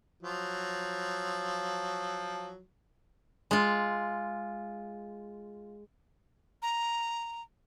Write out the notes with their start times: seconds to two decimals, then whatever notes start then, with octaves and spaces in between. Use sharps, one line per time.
0.22 F3 F#3
3.51 G#3 F4
6.62 A#5